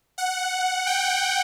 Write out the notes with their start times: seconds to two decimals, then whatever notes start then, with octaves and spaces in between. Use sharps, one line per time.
0.18 F#5
0.87 G5